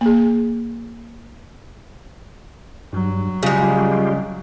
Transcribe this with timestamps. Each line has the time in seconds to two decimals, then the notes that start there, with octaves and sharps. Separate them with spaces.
0.01 A#3 G#4
2.93 G2 F#3
3.43 C#3 G3 G#3 F4 G4